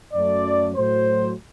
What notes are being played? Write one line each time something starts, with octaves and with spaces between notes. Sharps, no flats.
F#2 F#3 A3 D5
A2 F#3 A3 C5